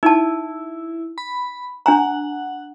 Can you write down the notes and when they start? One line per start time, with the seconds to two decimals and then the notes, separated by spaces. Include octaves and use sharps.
0.03 D#4 E4 A5
1.18 B5
1.86 D4 F#5 G#5 A#5